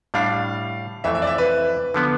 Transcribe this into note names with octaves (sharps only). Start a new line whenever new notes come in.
A2 G3 D4 F5
F2 E3 A3 E5
E5
D5
E5
B4
D3 F3 B3